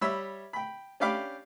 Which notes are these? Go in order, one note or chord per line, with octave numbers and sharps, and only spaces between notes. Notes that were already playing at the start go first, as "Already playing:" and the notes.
G3 C#5 E5 B5 E6
G5 B5
C#4 D4 G4 F5 B5 D6